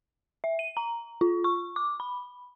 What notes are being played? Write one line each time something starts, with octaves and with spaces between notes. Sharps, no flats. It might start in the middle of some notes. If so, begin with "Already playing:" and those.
E5
D#7
A#5
F4
C#6
D6
B5